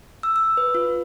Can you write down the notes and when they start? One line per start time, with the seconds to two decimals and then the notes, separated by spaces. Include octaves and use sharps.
0.23 E6
0.36 E6
0.57 B4
0.74 F4